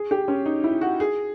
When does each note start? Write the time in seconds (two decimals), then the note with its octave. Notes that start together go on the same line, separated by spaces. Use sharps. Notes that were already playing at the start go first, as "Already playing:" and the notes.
Already playing: G#4
0.11 G4
0.28 C#4
0.46 D#4
0.64 E4
0.81 F#4
1.00 G#4